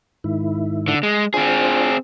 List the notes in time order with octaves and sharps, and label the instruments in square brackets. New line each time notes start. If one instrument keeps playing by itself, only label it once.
[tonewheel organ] G#2 D#3 E4
[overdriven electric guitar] D3
G#3
[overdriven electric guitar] C4 G#4 [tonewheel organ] D4 F4 C5